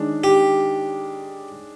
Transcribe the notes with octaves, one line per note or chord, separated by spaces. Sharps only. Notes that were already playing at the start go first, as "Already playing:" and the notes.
Already playing: D#3 G#3 D4
G4